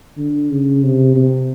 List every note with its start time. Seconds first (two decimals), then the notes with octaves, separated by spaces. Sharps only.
0.18 D3
0.50 C#3
0.83 C3
1.15 C3